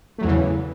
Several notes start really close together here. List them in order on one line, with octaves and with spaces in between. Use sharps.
A3 F#3 E2 E3 C#3